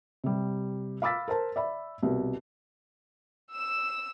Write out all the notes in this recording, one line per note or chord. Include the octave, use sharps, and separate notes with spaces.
C3 G3
F5 B5 D6 E6 A6 B6
A#4 C5 A5
D5 E5 B5
C2 B2
E6 E7